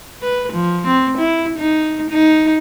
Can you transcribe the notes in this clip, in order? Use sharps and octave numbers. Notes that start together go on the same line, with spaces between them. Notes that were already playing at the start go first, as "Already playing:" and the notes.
B4
F3
C4
E4
D#4
D#4